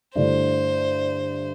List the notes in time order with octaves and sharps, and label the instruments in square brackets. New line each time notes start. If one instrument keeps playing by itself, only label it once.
[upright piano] G2 D3 A3 E4 [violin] C5